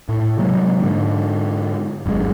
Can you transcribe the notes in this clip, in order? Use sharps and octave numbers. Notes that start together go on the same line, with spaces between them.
A2
C3 F#3 G#3 A#3
G#2 D3
G1 F#2 C#3 G#3